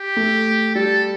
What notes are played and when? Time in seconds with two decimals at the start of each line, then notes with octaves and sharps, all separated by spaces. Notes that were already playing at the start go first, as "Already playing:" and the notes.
Already playing: G4
0.17 A3
0.75 G3 A4